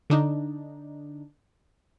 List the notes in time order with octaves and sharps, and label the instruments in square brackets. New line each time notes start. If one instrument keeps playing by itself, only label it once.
[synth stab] D3 D4 D#4